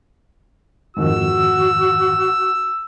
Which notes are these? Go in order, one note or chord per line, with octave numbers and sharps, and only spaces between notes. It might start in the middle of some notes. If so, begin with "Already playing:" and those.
F2 G#2 D#3 F#4 E6